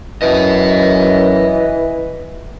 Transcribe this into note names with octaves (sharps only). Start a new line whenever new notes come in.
F#2 E3 B4 D#5